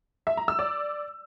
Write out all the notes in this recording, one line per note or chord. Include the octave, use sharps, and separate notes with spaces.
E5
A#5
E6
D5